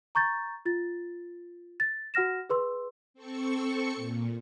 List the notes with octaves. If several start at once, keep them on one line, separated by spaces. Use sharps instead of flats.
A#5 C#6 G6 A6
F4 A6
A6
F#4 F#5 F6 A#6 E7
G#4 B4 C6 E6
C4 A4 C#6 C#7
A#2